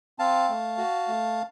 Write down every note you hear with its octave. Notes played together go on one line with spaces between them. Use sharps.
C4 F5 A5
A3
F#4
A3